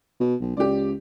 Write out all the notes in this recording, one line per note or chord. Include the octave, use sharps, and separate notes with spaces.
B2
B1
C#2 G4 D5